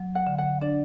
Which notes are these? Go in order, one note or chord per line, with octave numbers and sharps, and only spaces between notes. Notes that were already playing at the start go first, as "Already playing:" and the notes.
Already playing: F#3
F#5
D3
F#5
D4 D5